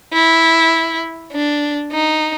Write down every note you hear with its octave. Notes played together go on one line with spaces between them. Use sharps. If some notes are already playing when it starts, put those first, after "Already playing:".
E4
D4
D#4